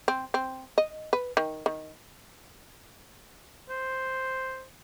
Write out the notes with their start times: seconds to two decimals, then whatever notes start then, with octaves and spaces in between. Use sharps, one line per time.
0.08 C4
0.34 C4
0.78 D#5
1.13 B4
1.37 D#3
1.66 D#3
3.70 C5